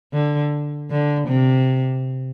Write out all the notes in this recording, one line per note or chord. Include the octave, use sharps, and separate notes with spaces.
D3
D3
C3